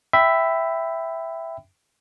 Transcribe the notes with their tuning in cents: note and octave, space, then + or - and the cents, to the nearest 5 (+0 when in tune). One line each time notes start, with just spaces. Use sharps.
E5 +0 G5 +0 B5 +20